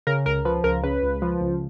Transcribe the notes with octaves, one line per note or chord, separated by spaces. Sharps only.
C#3 A#4
C#2 A#4
F3 B4
C#2 A#4
C#3 B4
C#2
F3
C#2